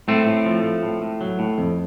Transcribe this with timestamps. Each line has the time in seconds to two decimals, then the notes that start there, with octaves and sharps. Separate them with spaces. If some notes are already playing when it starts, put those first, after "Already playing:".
0.08 A2 A3 C4
0.27 A2
0.46 F3
0.64 F3
0.83 A2
1.02 A2
1.21 F#3
1.39 A2
1.58 F2